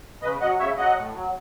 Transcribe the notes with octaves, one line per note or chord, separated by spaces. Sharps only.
C#3 B4 D#5
F#3 D#5 F#5
C#3 C#5 E5
F#3 D#5 F#5
A2
F#3